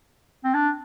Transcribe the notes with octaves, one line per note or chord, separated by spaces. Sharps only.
C4
D4